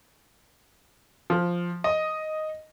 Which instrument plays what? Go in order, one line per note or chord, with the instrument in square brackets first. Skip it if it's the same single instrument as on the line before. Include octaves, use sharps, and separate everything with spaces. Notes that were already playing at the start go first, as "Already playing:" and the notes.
[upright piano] F3
D#5